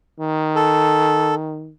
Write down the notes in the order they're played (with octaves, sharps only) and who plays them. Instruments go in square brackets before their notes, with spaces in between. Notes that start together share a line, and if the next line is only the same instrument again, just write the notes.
[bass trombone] D#3
[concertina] A4